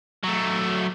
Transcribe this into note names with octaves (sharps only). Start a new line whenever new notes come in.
F#3 A3